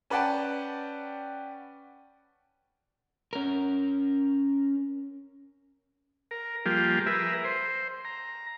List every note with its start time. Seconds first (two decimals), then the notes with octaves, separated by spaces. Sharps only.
0.10 C#4 B4 D5 F#5 G5 A5
3.33 C#4 A#4
6.31 A#4
6.66 F3 G3 A#3 F4 G4 G#4
7.06 G#4 A#4 B4 E5
7.45 C5
8.05 A#5